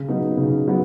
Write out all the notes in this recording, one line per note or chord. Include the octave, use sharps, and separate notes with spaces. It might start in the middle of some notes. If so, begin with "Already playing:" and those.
Already playing: C#3
F#3 B3 D#4
C#3
F#3 B3